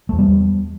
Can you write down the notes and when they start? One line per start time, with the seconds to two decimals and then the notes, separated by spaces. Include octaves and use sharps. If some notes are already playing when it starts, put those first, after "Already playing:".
0.09 E2 A3
0.19 G3 B3